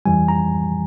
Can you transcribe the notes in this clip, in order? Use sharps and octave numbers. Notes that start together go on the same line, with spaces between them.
F2 E3 G3 G#5
A#5